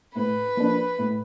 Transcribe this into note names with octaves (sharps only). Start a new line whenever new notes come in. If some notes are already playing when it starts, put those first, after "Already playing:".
A2 B4
F3 A#3 D4
A2